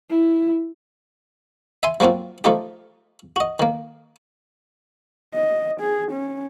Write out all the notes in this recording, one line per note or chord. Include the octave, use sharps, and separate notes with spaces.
E4
E5 G#5 C6
F3 F#3 A#3 C4 F4
F3 A3 D#4 F4 G4
F#4 D#5
D#3 A#3
D#5
G#4
C#4